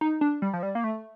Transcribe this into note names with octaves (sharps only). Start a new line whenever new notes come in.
D#4
D4
G3
F3
G3
A#3
A3